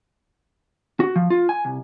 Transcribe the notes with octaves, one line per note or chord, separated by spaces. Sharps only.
F#4
F3
F4
G#5
C2